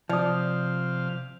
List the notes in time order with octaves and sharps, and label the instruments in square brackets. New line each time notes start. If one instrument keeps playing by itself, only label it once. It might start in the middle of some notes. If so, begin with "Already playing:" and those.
[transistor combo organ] C3 F5 [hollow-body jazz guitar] F3 [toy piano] D5 D#6